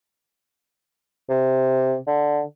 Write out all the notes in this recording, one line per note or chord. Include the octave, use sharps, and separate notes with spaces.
C3
D3